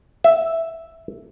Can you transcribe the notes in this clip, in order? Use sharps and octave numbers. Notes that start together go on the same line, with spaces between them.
E5